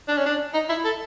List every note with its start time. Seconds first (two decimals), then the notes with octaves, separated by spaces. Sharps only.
0.08 D4
0.17 C#4
0.25 D4
0.53 D#4
0.69 E4
0.84 A4